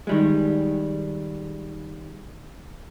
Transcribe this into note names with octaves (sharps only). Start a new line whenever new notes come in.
D#3 G3 G#3